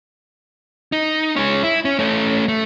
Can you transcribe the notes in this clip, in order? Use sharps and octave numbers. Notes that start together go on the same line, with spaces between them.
D#4
G#3 C#4
E4
C#4
A3 C#4
A3